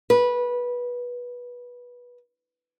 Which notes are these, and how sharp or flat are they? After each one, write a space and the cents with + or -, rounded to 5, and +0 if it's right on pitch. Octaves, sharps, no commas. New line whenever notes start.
B4 -20